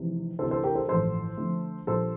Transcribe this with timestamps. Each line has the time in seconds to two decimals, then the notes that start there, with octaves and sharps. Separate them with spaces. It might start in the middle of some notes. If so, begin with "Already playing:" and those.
Already playing: F1 E2 C3 E3
0.39 D2 C3 E3 A4 C5
0.51 A4 C5
0.64 G4 A#4
0.75 A4 C5
0.88 A1 G2 F3 A4 C5
1.37 F2 D3 A3
1.87 A#1 A#2 G3 A4 C5